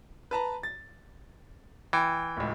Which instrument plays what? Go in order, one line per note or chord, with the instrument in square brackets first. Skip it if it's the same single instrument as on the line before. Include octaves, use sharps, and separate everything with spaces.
[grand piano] B4 A5 A#5
A6
[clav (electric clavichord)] E3 [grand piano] G5
[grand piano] D1 C#2